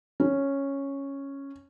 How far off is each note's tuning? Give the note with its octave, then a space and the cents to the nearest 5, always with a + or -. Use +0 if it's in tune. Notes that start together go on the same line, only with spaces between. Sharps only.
C#4 -5